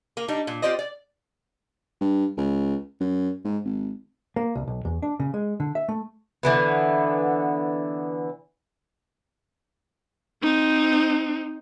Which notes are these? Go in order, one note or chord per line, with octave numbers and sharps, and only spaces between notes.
A#3
G3 D4 D#4
A#2
C4 F4 G4 C5 D5 D#5
D5
G2
C#2
F#2
G#2
G#1
A#3
C2
B1
E2
D4
C#3
G#3
D3
E5
A3
D3 E3 B3
C4 D#4